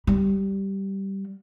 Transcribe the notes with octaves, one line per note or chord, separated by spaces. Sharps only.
G3